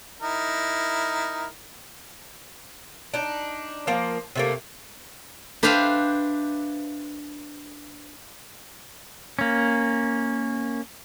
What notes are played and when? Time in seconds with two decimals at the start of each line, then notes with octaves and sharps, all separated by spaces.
0.21 D#4 E4 A#4
3.14 D4 D#4
3.87 F3 A#3
4.35 C3 A3 A#3
5.63 D4 B4 C5 E5 F5 G5
9.39 A#3 C#4